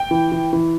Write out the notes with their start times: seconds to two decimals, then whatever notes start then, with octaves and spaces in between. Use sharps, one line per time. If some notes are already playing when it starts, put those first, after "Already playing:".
Already playing: G5
0.11 E3
0.32 E3
0.53 E3